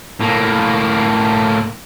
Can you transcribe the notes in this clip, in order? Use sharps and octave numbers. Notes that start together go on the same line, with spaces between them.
A2 A#3